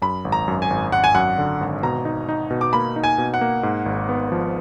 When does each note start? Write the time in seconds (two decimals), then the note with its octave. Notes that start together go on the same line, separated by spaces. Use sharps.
0.02 F#2 B5
0.25 G#1
0.32 A#5
0.48 F#2
0.62 G#5
0.70 G#1
0.92 G#1 F#5
1.04 G#5
1.14 F#2 F#5
1.38 D3
1.61 G#1
1.83 B2 A#5
2.05 D#4
2.29 D#4
2.50 B2
2.61 D6
2.73 A#3 B5
2.96 D#4
3.04 G#5
3.18 B2
3.34 F#5
3.41 A#3
3.63 G#2
3.86 G#1
4.09 B3
4.32 F3